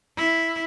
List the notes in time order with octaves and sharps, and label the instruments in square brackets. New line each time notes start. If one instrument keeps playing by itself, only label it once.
[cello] E4